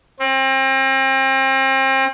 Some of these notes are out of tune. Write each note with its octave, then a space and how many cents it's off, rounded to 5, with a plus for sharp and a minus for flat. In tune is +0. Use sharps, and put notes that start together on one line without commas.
C4 +35